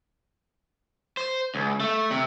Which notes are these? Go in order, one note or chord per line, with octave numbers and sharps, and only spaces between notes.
C5
C#2
A3
C3